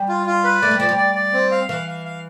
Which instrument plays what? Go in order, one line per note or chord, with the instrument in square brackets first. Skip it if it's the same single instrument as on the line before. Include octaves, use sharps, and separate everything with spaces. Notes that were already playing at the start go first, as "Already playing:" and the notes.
Already playing: [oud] G3
[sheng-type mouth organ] F4
F4
B4
[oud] A3 [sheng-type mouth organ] D5
[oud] G3
[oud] F3 [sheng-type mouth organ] D5
[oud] G3
[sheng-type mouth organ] D5
D5
C4
F5
[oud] E3 [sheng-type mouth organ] F5
[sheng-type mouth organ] F5
F5